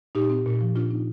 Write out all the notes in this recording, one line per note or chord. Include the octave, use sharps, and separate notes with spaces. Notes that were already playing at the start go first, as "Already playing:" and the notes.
A#2 D#4 G4
C4
A#2
F3
A#2 D4 F4
C4 D#4